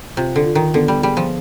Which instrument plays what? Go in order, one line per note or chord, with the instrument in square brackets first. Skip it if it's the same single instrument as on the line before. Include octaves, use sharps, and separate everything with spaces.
[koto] C3 [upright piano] F4
[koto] D3
[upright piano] F4
[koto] D#3
[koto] D3 [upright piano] B3
[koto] G3
[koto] G3 [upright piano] G#4
[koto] F3